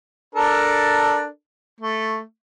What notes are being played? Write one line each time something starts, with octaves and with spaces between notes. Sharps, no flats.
D4 A4 A#4
A3